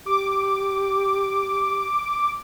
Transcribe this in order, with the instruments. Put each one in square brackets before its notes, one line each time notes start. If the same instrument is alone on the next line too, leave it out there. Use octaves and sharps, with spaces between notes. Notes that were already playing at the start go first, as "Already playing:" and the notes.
[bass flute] G4 [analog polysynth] D6